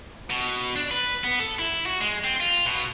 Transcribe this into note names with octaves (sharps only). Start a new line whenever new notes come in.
B2
D4
B4
B3
A4
E4
F#4
G#3
C4
F4
B2